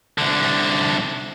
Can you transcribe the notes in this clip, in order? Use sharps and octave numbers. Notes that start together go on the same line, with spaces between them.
C2 D3